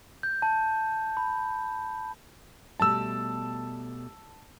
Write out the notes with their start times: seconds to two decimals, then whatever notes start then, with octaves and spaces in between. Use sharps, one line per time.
0.23 G6
0.42 A5
1.17 B5
2.80 B2 G3 A3 A5 E6